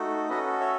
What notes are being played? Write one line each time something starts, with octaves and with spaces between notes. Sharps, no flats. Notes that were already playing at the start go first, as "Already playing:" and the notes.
Already playing: A3 D#4 F#4 A4
C#4 F#4 A4 B4 D#5
C#5 E5